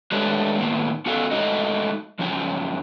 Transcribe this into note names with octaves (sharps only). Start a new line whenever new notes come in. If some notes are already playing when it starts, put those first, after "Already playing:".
G#3 A3 D4 G4 B4 C#5
A2 D#3 A#3 B3
B3 C#4 F#4 A4 F5
G#3 A3 D#4 F#4 D#5
F#2 F3 C#4 D#4